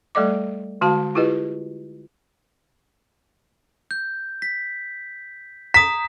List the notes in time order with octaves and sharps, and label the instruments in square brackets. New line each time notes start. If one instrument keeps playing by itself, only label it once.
[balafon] G3 A3 A4 D5 D#5 D6
D3 G#3 F#4 F5 A5
E4 F4 G4 G#4 B4 D#5
[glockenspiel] G6
B6
[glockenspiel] A#5 D#6 [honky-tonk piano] B6